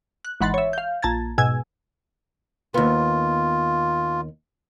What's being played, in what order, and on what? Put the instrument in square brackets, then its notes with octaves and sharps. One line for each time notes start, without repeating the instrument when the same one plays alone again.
[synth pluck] F#6
G#1 E3 F#5 B5 C6 A6
C#5 E5
F5 G6
A#1 A5 A#5 G#6 A6
G#2 B2 G#5 E6 G#6
[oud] D#2 B3 [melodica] F4